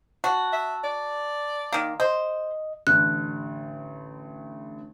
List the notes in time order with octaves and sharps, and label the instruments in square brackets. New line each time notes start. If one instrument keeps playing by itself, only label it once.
[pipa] F#4 [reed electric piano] A5
[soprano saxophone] E5
D5
[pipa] D#3 A#3
[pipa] C5 [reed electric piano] D#5
[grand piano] A1 D3 [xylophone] F#6